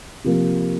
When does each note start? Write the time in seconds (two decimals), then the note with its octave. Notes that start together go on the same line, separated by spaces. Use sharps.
0.24 C3 F3 A#3